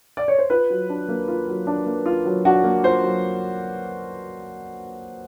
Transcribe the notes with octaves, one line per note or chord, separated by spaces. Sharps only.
D5
C#5
C5
F4 B4
F#3
D4
A#3
F4
F#3
D4
A#3
F4
F#3
D4 F#4
A#3
F4 C5
F#3